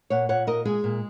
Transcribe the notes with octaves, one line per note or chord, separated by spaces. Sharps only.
A#2 C#5 F#5
A#2 C#5 F#5
D#4 A#4 D#5
G#3 G#4
A#2